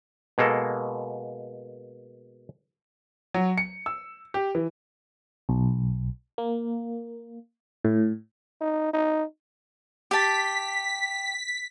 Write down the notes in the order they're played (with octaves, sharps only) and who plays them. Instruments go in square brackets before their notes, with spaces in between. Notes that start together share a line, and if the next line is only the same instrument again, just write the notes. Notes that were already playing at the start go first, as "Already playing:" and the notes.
[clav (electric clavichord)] B2 G#3 A#3 A4
[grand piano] F#3
C#7
E6
G4
E3
[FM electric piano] B1
A#3
A2
[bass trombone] D#4
D#4
[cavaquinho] G4 A5 [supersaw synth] B6